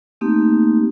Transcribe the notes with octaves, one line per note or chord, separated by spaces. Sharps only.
A3 A#3 C4 D#4 G4